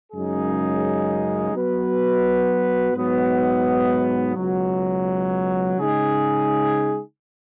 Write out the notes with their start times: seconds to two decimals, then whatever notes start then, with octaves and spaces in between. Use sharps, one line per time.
0.13 F#2 C#3 G#3 D#4 G#4
1.53 F#3 B3 F#4 B4
2.94 G#2 F#3 B3 D#4
4.35 C#2 B2 F#3
5.77 C#3 G#3 D#4 G#4